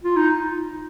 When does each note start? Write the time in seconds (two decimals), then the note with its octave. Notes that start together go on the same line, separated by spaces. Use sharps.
0.04 F4
0.16 D#4